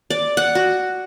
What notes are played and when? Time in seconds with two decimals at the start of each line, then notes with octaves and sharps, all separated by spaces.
0.10 D5
0.37 F#5
0.55 F#4